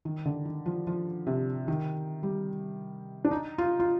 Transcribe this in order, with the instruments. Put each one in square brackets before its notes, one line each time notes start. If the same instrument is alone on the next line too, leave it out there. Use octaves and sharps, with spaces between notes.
[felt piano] D#3
D3
D#3
F3
F3
C3
D#3
G3
D4
D#4
F4
F4